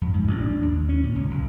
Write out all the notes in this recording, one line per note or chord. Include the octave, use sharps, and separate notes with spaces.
F2
G#2
A1
D4
D#2
C#4
A#2
C#2
B1